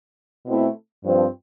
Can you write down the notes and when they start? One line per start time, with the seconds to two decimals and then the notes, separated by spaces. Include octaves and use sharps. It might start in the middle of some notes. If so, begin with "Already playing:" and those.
0.46 B2 A3 C4 E4
1.05 G2 F3 C4